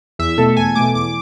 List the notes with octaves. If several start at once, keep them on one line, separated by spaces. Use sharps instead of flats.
E2 E5
B2 A3 A4
E2 G#5
B2 A3 D6
E2 D6